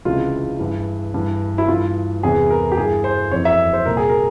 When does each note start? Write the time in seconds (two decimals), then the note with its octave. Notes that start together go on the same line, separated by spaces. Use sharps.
0.05 C#2 C3 E3 F4
0.59 G2 E3
1.14 G2 E3
1.58 E4
1.68 G2 E3 F4
2.22 E2 C3 E3 G#4
2.51 A#4
2.72 G4
2.77 G2 E3 G#4
3.04 C5
3.31 F2 C#5
3.36 E3
3.45 E5
3.73 C5
3.85 C2 A#2 A#4
3.97 G#4
4.10 A#4